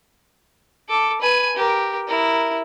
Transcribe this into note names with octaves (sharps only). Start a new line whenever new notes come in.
A4 D6
B4 G#5
G4 A#4
E4 A#4